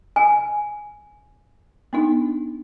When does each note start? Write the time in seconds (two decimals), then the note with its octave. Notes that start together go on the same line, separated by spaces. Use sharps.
0.16 G#5
1.93 B3 D4 D#4